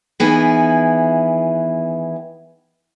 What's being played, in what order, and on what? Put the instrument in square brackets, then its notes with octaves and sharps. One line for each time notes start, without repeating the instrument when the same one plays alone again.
[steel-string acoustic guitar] D#3 E3 B3 E4 G#4